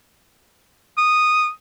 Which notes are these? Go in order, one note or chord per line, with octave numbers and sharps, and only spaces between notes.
D#6